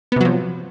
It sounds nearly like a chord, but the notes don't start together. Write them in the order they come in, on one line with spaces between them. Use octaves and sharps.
B3 C3 F#3 F3